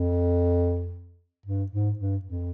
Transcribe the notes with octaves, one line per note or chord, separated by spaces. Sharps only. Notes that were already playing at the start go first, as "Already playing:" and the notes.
Already playing: F2
G2
G#2
G2
F2